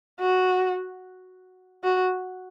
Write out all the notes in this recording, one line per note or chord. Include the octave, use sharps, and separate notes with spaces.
F#4
F#4